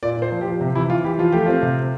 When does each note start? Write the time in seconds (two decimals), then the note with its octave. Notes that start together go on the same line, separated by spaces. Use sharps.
0.03 A#2 D5
0.17 A#2 C5
0.32 F3
0.41 G4
0.46 F3
0.61 C3 G4
0.75 E3 E4
0.90 E3 F4
1.04 E3 G4
1.19 F3 F4
1.32 A3 G4
1.46 C4 F4
1.63 C3